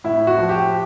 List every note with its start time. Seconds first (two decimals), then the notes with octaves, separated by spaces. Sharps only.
0.04 A2 E4
0.27 F#4
0.38 F3
0.49 G4